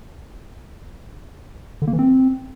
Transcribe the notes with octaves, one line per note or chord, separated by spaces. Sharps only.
D3
A#3
E3
C4